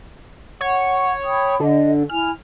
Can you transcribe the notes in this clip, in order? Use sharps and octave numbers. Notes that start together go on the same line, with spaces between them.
C#5 F#5
G5 B5 D#6
D3 D#5
E4 G#5 F6